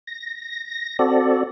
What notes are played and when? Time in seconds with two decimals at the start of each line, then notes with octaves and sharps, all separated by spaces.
0.07 A#6
0.99 C4 F#4 A4 D5